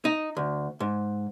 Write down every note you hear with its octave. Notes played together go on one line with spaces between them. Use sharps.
D#4
D2
G#2